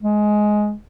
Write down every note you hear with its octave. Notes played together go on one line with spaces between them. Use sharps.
G#3